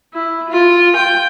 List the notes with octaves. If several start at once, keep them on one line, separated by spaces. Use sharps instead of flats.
E4
F4
G5